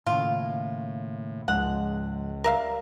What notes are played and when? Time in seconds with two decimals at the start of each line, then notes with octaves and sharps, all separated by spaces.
0.06 D#2 A2 C#3 F4
1.48 C#2 G#2 F3 G#3 F#5
2.44 G3 A#4 E5 F5